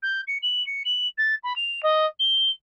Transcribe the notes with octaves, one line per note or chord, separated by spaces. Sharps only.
G6
C#7
F#7
C#7
F#7
A6
B5
F7
D#5
G7